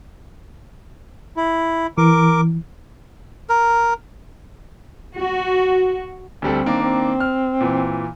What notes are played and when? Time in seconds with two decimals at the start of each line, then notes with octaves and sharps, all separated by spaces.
1.37 E4
1.98 E3 A#4 D6
3.49 A#4
5.15 F#4
6.42 D2 G3 C4 A4
6.66 D#3 A#3 D4
6.83 C4
7.20 F6
7.61 A#2 E3